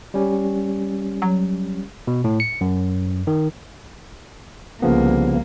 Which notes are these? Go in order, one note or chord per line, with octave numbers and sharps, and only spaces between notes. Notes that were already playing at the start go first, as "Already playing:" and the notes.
G3 C#4 G4
F#3
B2
A2
C#7
F#2
D#3
C2 C#3 F3 A#3 B3